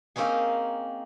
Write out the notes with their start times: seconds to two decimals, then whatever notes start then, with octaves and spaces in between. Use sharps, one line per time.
0.16 A#3 C4 C#4 D#4 G#4